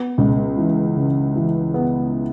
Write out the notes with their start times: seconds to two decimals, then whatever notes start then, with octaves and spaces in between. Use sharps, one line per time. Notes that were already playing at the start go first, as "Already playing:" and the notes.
Already playing: B3
0.18 C#2
0.58 E3
0.97 C#3
1.35 E3
1.74 B3